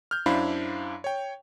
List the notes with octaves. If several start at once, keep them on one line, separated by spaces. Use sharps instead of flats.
F6 G6
F#2 D4 E4 C5 F5 B5
C#5 G5